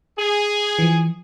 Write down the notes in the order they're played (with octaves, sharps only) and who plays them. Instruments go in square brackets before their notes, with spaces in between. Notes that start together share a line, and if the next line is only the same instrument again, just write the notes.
[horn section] G#4
[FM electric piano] E3 F3